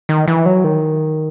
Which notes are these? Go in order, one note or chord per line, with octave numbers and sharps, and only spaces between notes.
D#3
E3
F#3
D#3